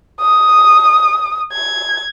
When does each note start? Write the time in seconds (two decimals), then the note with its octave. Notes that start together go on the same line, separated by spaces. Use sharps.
0.22 D#6
1.53 G#6